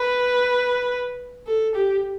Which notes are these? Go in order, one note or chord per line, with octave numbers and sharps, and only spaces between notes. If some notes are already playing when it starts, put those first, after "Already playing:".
Already playing: B4
A4
G4